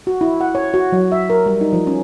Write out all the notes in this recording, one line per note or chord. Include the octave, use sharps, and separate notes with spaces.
F#4
E4
F#5
C#5
F#4
F#3
E5
A#4
G3
D#4
F3
C#4